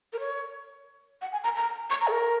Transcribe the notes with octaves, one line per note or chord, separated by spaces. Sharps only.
A#4
C#5
F#5
G#5
A#5
A#5
C#6
A#5
G#4
A#4